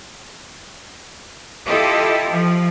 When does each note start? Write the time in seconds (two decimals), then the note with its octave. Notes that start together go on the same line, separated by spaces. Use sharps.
1.66 E4 F4 G4 A4 D#5
2.30 F3